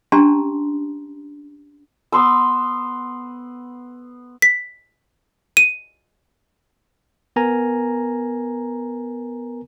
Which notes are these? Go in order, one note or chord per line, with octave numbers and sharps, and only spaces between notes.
C#4 D4 G4 A5 A#5 C6
B3 C6 E6
B6
D#7
B3 A#4 G#5 A#5